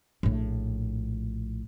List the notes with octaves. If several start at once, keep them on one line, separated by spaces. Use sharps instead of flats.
A#1 A2